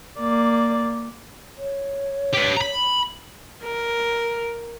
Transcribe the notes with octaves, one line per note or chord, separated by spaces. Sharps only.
A#3 D5
C#5
G4 B4
A#5 B5
A#4